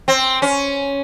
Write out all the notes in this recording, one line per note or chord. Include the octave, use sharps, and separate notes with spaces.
C4
C#4